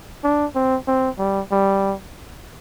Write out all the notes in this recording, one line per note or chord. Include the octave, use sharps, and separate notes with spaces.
D4
C4
C4
G3
G3